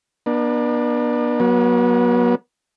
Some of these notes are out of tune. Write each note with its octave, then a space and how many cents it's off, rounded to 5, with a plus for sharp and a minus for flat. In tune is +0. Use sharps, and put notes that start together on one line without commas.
B3 -40 D4 +35
F#3 +0 B3 -40